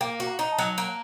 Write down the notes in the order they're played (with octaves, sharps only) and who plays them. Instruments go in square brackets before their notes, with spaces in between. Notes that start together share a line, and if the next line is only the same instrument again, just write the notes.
[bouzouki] A#3 [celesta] G5
[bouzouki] F#4
[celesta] A#5
[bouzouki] D#4
[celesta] A5
[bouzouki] F#3
A#3